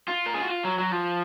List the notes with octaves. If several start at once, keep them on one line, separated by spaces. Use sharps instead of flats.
F4
A#4
G#4
F#4
F4
F#3
F#3
F3